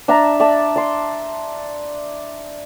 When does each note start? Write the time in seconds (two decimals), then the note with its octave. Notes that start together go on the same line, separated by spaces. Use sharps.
0.08 D4 E5 A5 A#5
0.40 D5 E5 A5
0.76 D5 C6